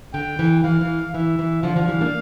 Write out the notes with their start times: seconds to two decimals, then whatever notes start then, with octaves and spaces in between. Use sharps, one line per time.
0.14 D3 G5
0.39 E3
0.64 E3 F5
0.81 E3
1.14 E3 E5
1.39 E3
1.63 D3 F3 F5
1.76 D3 F3
1.88 E3 G3
2.01 A#3 D4